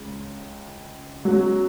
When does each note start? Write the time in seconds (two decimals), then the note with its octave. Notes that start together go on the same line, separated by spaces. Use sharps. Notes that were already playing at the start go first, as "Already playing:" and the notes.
Already playing: C#2 C#3 G#3
1.25 B2 F#3 G#3 C#4 F#4